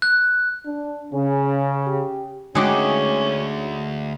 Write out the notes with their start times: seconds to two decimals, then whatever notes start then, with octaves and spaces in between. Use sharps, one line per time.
0.02 F#6
0.65 D4
1.13 C#3 C#4
1.87 G4
2.55 D2 G#3 C#4 D#4 F#4 G5 D6